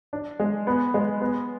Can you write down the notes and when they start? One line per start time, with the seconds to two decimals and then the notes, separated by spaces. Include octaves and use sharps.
0.13 D4
0.40 G#3
0.67 B3
0.94 G#3
1.21 B3